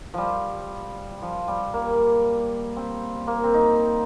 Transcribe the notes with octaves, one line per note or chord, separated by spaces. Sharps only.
F3 G3
F3
G3
A#3
C4
A#3
C4
D#4